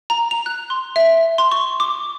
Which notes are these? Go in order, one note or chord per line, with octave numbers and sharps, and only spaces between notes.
A#5
F7
F#6
C6
E5
C6
C#6
D6